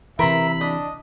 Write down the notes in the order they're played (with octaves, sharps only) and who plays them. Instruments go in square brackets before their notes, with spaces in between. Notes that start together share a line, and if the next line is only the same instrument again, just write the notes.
[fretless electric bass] C3 E3 [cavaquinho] A#4 C5 A#5 [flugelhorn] E5 [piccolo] B5
[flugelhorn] D4 [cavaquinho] D#5